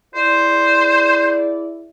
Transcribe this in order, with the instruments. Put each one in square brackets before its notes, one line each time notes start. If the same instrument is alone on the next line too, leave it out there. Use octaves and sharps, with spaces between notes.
[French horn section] E4 G#4 D5 [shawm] C5